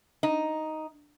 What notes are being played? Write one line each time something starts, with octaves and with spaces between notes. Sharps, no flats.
D#4